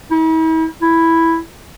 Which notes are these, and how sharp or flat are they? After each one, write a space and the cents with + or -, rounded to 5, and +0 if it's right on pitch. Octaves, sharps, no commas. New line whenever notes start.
E4 -45
E4 +0